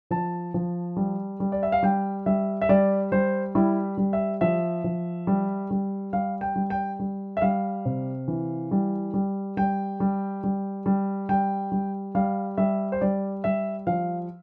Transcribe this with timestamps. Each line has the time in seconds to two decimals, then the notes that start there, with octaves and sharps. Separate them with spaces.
0.11 F3 A5
0.54 F3
0.97 G3
1.40 G3
1.52 D5
1.63 E5
1.72 F5
1.83 G3 G5
2.26 G3 E5
2.61 E5
2.69 G3 D5
3.12 G3 C5
3.55 G3 E4
3.98 G3
4.13 E5
4.41 F3 E5
4.84 F3
5.27 G3
5.71 G3
6.13 G3 F5
6.41 G5
6.56 G3
6.70 G5
6.99 G3
7.37 E5
7.42 G3 F5
7.85 C3
8.28 E3
8.71 G3
9.14 G3
9.57 G3 G5
10.00 G3
10.44 G3
10.86 G3
11.29 G3 G5
11.72 G3
12.15 G3 F5
12.58 G3 E5
12.92 C5
13.01 G3 D5
13.44 G3 E5
13.87 F3 F5